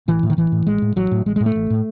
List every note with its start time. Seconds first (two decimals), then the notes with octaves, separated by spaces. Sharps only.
0.08 A1 E3
0.23 A2
0.30 D#3
0.37 A1 E3
0.52 A2
0.67 A1 G#3
0.82 A2
0.96 A1 F#3
1.11 A2
1.26 A1 G#3
1.36 A2 G#3
1.46 A3
1.56 A1
1.70 A2